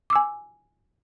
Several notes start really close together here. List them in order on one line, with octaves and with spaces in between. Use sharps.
D6 E6 G#5